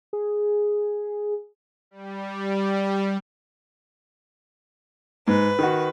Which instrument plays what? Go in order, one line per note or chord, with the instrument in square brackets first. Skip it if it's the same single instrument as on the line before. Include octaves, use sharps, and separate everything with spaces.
[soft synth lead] G#4
[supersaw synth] G3
[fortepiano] G#2 [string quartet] B4
[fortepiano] D#3 F#4